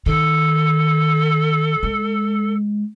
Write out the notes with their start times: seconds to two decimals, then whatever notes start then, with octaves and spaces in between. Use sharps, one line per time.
0.06 D#3 A4
1.83 G#3